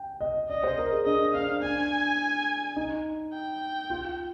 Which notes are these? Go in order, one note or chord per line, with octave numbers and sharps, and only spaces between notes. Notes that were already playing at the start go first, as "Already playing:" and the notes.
Already playing: G5
D#5
D5 D#5
C5
A#4
G#4
D4 D#5
D4 F5
D4 G#5
D#4
G5
F4